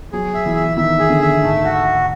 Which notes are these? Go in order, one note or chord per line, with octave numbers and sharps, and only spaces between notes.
F#3 G#4
E5
E3
E5
D#3 E5
G#4
D3
E5
G#2 A3
F#4